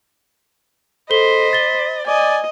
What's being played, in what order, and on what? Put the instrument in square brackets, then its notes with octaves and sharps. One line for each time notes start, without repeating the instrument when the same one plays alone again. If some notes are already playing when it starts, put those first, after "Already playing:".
[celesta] A4 G7 [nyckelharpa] C5 [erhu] D#5 [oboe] B5
[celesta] A6 G7
[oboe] D5 [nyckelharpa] D#5 [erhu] G#5